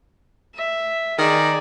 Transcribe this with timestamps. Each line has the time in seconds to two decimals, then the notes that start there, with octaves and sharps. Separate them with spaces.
0.55 E5
1.18 D#3 G#4 D5